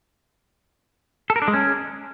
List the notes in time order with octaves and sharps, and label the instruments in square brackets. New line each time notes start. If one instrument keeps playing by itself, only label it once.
[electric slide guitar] A4
A#4
D4
G#3
C#4